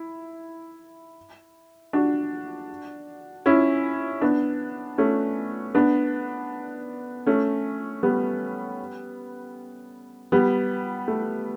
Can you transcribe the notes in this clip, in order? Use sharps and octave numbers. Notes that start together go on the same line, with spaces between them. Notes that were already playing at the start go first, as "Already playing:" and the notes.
Already playing: E4
D4 F#4
C#4 E4
B3 D4
A3 C#4
B3 D4
A3 C#4
G3 B3
G3 B3
A3